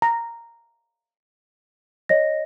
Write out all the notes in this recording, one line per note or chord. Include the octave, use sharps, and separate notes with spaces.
A#5
C#5 D#5 A#6